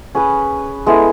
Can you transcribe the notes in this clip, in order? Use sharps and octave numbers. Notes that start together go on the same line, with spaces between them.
C#4 G#4 B4
G#3 B3 E4 A4